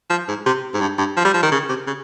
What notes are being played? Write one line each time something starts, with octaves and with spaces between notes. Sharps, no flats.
F3
G#2
C3
G#2
G2
G2
F3
G3
F3
D#3
C#3
C3
C#3